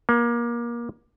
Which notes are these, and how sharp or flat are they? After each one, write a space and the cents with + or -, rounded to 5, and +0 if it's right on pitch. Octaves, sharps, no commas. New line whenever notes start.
A#3 +25